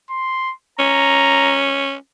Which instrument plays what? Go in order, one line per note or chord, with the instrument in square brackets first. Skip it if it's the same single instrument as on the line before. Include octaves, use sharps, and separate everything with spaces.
[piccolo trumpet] C6
[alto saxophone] C#4 [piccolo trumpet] A#5